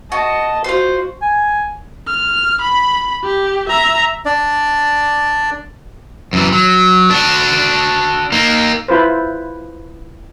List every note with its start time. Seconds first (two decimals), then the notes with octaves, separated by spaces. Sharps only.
0.12 F#4 D#5 A5
0.64 F4 F#4 C5 C6
1.22 G#5
2.07 F6
2.62 B5
3.24 G4
3.69 E5 A#5
4.26 D4 D5
6.33 F#2 E3
6.52 F#3
7.10 D4 F#4
8.32 A#3 D#4
8.88 E4 F4 B4 C5